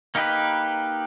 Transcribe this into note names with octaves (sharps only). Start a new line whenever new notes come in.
A#3 D#4 G4 B4